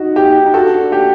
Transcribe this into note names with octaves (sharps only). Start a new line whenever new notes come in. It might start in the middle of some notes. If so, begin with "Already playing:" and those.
Already playing: D#4 F#4
G4
D#4
D4 F#4 A4
G4